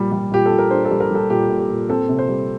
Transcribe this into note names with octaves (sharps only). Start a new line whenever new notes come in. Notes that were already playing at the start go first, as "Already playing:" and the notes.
Already playing: A#2 G3
G3
A#2 G4
A4
A#2
A#4
D4 C5
A4
G3
A#4
G3 A4
A#2 G4
A#2
G4
A#2
C4 A4
C3
C5
G3